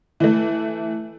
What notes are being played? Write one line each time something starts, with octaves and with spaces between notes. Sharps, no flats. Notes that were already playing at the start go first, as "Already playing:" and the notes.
E3 A3